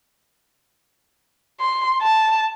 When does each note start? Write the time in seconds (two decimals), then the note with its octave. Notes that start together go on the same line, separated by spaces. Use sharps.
1.60 C6
2.02 A5